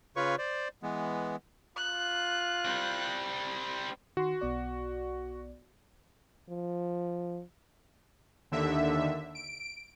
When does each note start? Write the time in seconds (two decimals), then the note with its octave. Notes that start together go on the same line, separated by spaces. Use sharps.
0.16 C#3 F4 B4 C#5 C#6
0.38 C5 D5
0.83 E3 G#3 B3
1.77 F4 F#6
2.65 G3 C4
4.17 D#3 F#4 C6
4.41 B1 B3 D5
6.49 F3
8.52 D#2 D3 E5
9.35 D7